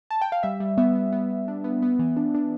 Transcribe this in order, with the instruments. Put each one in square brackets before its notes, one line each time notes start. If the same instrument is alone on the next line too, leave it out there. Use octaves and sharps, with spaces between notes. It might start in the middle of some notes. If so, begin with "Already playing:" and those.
[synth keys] A5
G5
F5
G3 E5
G3
B3 E5
B3
B3
B3
D4
B3
B3
E3
D4
D4